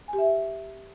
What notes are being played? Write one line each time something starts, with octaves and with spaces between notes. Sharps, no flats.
G#5
G4
E5